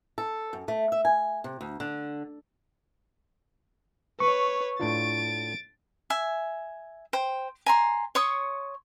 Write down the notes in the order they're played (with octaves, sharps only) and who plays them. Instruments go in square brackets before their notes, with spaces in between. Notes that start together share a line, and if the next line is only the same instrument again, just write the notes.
[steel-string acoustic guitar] A4
F#2
A3
E5
G#5
C3
D2
D3
[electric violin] B4 C#5 [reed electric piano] C#6
[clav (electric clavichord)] A2 D4 F4 [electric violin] A6 D7
[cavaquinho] E5 G#5
C5 G5
G#5 A#5 C6
C#5 C6 C#6 D#6